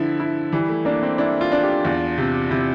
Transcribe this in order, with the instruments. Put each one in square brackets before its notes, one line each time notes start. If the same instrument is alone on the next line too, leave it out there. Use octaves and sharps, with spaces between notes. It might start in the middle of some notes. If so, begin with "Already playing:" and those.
Already playing: [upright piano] D3 E4 [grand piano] F3
[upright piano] E4
[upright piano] E3 [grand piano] G3
[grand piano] A3
[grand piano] A#3 [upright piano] D4
[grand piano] C4
[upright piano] D4 [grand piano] E4
[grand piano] F4
[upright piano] D4
[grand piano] G4
[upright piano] E2 [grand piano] F4
[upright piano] C3
[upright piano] C3 [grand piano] E4